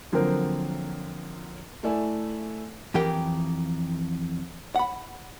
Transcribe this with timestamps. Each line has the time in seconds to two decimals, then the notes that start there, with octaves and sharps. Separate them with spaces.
0.12 D3 F3 F#3 A#3 C4 A#4
1.83 A3 E4 A4 D5 G#5
2.94 F2 E3 G4 A#4 G5
4.76 F#5 B5